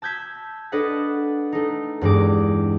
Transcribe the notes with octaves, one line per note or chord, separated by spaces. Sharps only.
A5 E6 G6 G#6 B6
D4 A4 B4 D#5 F#5
A3 D#4
E2 G2 G#3 D6